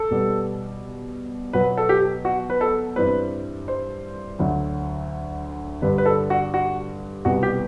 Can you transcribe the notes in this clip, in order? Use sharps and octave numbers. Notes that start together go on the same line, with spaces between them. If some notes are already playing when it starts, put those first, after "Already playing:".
Already playing: A4
B2 G3 B3
B2 F#3 B3 B4
A4
G4
F#4
B4
A4
G2 E3 G3 C4 B4
C5
D2 D3 F#3
G2 D3 G3 B4
B4
A4
F#4
F#4
C2 B2 G3 B3 F#4
G4